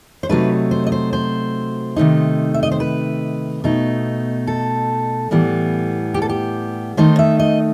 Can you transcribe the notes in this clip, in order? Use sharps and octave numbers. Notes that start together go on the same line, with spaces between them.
C5
C3 F#3 A3 D#4 B4
C5
D#5
C5
C5
C3 D#3 A3 D#4
E5
D#5
C5
B4
B2 A3 D#4
A4
A2 E3 G3 B3
G4
A4
G4
D#3 A3 D#4 C5
E5
D#5